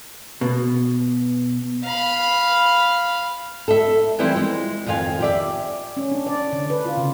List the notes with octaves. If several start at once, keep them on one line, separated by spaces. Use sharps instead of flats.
B2
F5 B5
A4 E5
E3 F3 G3 C4 E4
G#3
F2 D#3 F4 F5 G#5
G4 D5 E5
C#4
D4
D5
D3
B4
F4
C#3